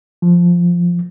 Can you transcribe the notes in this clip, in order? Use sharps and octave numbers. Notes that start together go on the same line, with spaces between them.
F3